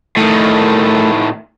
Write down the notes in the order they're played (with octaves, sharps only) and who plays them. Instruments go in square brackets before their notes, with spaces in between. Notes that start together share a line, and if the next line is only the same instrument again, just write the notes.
[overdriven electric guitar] A2 D#3 [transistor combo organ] A3